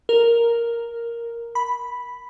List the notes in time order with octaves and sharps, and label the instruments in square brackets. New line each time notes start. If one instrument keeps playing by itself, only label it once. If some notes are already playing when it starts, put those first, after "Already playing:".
[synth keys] A#4
B5